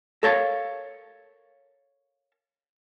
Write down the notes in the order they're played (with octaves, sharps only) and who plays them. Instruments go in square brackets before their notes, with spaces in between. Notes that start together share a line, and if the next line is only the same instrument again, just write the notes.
[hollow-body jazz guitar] A4 A#4 C#5 F5 A5